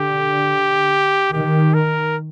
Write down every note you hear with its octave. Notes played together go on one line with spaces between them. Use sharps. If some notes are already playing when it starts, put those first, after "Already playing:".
Already playing: D3 G4
D#3 G4
A#4